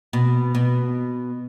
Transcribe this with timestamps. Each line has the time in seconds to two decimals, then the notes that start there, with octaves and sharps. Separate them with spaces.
0.13 B2
0.55 B2